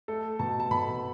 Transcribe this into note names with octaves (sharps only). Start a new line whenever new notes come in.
A3 A4
B2 A5
A5
B2 B5